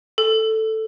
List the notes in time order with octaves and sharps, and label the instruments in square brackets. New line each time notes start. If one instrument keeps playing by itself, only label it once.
[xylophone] A4